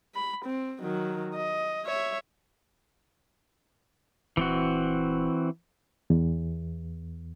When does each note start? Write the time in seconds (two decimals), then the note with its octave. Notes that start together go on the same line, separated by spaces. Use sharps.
0.15 B5
0.45 C4
0.81 D#3 F#3
1.35 D#5
1.86 C#5 E5
4.37 D#1 E3 C4 F#4
6.10 E2